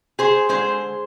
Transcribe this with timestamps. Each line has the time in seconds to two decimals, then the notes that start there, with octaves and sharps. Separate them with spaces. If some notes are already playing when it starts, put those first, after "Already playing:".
0.19 G#4 C5
0.49 D3 G#3 G#4 C5